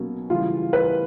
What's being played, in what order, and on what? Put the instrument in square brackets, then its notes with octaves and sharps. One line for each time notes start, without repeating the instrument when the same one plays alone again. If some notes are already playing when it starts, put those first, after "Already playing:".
Already playing: [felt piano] B2 F#3 A#3 C#4 F#4
[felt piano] C#3 E3 G3 [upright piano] F4
[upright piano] B4